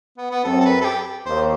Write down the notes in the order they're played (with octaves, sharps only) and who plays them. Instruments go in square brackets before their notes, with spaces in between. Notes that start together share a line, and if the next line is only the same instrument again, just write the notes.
[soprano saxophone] B3
B3
[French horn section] F#2 F#3 C4 [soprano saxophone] A4
[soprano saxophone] A4
B4
A4
G4
[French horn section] D#2 [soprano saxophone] C5